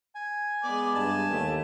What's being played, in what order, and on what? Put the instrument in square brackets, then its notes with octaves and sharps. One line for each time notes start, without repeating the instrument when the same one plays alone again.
[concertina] G#5
[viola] G#3 B3 [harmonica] D5
[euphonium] G2 [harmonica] A5
[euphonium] D#2 [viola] A3